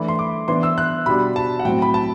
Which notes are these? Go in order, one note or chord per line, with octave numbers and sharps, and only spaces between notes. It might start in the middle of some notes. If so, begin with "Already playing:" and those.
Already playing: E3 A3 D4 B5
C6
D6
E3 B3 D4 C6
E6
F#6
B2 G3 D4 B5
A5
F#5
A2 F#3 C4 G5
B5
A5